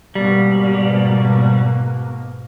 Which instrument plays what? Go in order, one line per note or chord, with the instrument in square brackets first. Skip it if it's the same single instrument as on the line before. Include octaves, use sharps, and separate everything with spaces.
[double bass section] G#2 B2 A#3 [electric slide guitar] G3